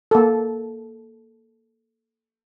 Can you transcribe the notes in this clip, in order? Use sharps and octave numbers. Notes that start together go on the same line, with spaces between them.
A#3 A4